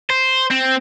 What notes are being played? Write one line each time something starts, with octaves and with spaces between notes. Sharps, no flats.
C5
C4